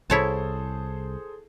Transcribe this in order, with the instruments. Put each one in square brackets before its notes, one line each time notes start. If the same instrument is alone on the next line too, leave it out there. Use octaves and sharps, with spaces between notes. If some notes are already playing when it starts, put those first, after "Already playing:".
[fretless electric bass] C2 [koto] E4 C#5 A5 [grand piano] G#4 A4 C5